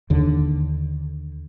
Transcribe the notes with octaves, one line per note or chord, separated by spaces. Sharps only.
D#2 D3